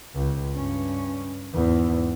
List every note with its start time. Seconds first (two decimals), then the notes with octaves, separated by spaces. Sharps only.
0.15 C#2
0.55 G2 C#4
1.54 E2 G#2